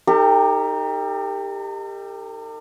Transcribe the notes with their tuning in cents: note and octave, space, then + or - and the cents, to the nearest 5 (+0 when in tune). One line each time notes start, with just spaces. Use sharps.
D#4 +0 G4 +20 A#4 -45